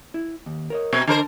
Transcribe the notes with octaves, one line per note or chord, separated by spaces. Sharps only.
E4
D#2
A#4 C#5 D#5
B2 C4
D3 A#4 C5 A5